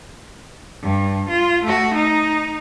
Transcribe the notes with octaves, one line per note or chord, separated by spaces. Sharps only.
G2
F4
A3 F#4
D#4